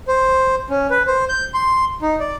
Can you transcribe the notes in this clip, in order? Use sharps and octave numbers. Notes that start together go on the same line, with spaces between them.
C5
C#4
B4
C5
G6
C6
D#4
D5